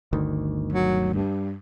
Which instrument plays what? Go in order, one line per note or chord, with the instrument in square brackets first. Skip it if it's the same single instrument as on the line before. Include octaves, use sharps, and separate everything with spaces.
[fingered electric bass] G1 D2 D#3
[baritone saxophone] F#3
G2